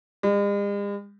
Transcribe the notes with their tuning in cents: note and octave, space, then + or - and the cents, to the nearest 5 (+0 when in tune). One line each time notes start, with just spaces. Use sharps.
G#3 -45